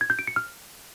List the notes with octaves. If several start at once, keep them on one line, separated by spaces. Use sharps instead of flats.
G#6
G6
D7
C#7
F6